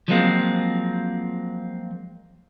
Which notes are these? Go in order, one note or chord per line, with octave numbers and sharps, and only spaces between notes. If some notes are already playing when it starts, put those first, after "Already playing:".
F3 F#3 G#3 A#3 C4 F4